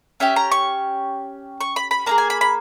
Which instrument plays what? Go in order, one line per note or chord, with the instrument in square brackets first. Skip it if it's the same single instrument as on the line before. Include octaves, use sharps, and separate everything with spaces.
[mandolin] C#4 G4 E5
A#5
C#6
C#6
B5
B5
A#3 E4 G#4 A#5
G#5
B5
B5